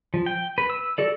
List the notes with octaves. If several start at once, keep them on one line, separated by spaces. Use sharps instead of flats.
F3
G5
B4
E6
F#4 A4 D5